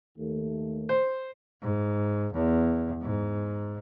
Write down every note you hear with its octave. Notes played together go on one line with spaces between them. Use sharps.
D#2 A3
C5
G#2
E2
G#2